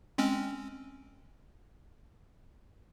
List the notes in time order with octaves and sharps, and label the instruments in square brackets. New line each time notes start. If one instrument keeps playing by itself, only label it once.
[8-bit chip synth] G#3 C4 C#4